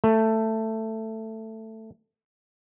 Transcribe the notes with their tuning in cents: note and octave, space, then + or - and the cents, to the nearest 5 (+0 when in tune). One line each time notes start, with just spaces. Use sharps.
A3 +10